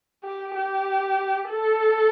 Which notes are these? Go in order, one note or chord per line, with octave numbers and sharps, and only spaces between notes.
G4
G4
A4